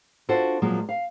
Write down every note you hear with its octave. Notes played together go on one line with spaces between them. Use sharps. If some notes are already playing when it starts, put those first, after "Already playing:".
D4 F4 F#4 A4 C5
A#2 F3 F#3 G#3 A#3
F5